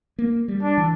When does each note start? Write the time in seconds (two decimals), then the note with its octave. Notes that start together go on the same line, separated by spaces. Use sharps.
0.19 A#3
0.48 G3
0.63 D4
0.78 E3